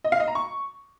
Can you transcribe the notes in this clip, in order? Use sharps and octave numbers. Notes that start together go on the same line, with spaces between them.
D#5
F5
D#5
A#5
C#6